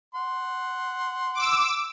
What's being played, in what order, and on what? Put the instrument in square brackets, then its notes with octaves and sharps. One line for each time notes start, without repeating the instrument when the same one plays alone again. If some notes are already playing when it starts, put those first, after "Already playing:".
[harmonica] F#5 C6
[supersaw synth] D6 E6